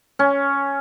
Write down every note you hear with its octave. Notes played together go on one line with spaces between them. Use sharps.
C#4